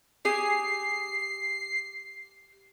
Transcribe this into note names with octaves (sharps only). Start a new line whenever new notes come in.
G4 G#4 G#5 C7